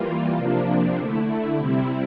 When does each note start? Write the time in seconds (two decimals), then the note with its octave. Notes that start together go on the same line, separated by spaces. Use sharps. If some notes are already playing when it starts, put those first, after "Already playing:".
Already playing: E3 G3 A#3 F4
0.36 C3 F3 A#3 D4
0.97 D3 A3 E4
1.58 C3 G3 C4 E4